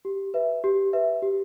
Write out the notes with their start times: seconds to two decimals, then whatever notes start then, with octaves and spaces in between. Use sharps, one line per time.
0.05 G4
0.34 B4 E5
0.64 G4
0.93 B4 E5
1.22 G4